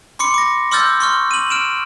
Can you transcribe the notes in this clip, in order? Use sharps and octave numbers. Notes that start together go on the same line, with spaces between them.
B5 C6 D6 C#7
D6 A#6
C6 D6 E6 F6 G6 A6
C6 C#6 F6
D#7 F#7
F6 D7 E7